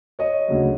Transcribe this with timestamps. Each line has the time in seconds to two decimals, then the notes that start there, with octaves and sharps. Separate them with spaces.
0.19 C#5 D#5
0.48 D2 C#3 F#3